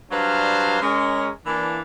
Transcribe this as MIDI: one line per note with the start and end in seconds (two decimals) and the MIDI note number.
0.11 0.78 54
0.11 0.78 55
0.11 0.78 62
0.11 0.78 71
0.11 0.78 72
0.11 0.78 77
0.82 1.28 56
0.82 1.28 61
0.82 1.28 70
1.46 1.82 52
1.46 1.82 58
1.46 1.82 62